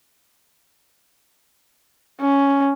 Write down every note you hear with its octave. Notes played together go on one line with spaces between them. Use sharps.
C#4